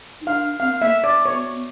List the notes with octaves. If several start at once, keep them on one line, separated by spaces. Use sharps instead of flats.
D#4
D4 F5
C4 F5
B3
A#3 E5
B3
D5
C#5